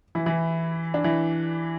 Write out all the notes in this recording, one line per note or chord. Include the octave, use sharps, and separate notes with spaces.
E3 E4
E3 E4
D4
E3 E4